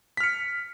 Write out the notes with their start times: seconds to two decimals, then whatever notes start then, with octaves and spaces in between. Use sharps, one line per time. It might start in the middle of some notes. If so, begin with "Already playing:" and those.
0.17 B6
0.20 F6
0.23 C#7